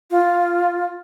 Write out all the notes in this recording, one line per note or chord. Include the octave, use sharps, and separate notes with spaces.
F4